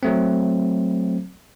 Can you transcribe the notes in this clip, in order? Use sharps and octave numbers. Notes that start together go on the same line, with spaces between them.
F#3 A3 C4